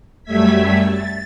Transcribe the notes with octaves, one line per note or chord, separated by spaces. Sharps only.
F#2 G3 A3 E5 G#6 B6
A6